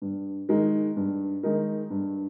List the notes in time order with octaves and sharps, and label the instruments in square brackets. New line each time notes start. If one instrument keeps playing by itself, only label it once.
[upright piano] G2
D#3 G#3 D#4 A#4
G2
D#3 G#3 D#4 A#4
G2